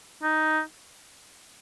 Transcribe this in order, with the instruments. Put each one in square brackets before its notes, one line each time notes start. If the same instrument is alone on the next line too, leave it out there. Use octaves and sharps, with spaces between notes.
[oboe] D#4